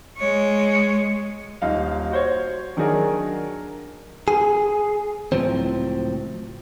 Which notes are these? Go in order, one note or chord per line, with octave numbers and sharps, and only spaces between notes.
G#3 C#5
D#1 D#4 F5
F#4 C5 C#5
D#3 F#3 D4 G#4 A#4
G#4
C#2 A2 F3 F#3 C4